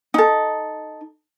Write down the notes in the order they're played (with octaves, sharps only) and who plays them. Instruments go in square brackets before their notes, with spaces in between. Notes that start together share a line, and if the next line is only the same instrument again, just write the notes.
[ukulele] D#4 A4